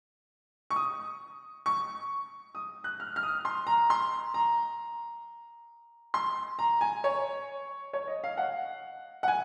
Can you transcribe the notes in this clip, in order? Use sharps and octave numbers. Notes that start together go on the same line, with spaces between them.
C#6
D#6
C#6
D#6
F#6
F6
F6
D#6
C6
A#5
C6
A#5
C6
A#5
G#5
C#5
C#5
D#5
F5
F#5
F#5
G#5